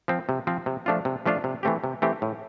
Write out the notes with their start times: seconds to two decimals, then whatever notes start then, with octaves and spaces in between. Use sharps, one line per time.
0.08 F3 C4
0.29 C3
0.47 F3 C4
0.66 C3
0.86 F3 A3 D4 F4
1.05 C3
1.26 F3 A3 D4 F4
1.44 C3
1.63 E3 A3 C4 G4
1.84 C3
2.02 E3 A3 C4 G4
2.22 A2